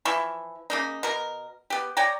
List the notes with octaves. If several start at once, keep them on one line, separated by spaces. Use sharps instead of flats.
E3 F3 E4 C#6
C#3 A#3 D#4
B2 A#4
B3 G4
C#5 D5 G5 A#5